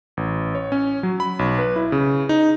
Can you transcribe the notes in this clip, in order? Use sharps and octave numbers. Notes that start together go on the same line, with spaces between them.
A1
C#5
C#4
F#3
B5
B1
B4
E4
C#3
D#4